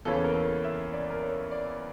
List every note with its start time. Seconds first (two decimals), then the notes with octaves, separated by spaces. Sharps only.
0.05 E2 C#3 E3 A#3 C#4 A4
0.24 A#4
0.34 A4
0.64 E5
0.93 D5
1.10 A#4
1.22 C#5
1.51 D5